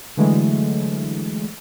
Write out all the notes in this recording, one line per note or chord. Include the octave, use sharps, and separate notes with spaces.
D3 E3 F#3 G#3 A3